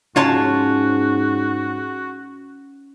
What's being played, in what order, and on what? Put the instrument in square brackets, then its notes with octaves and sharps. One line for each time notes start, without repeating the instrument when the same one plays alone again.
[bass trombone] G#2 [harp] C#4 [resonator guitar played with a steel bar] F4 C#5 A5 [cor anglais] F#4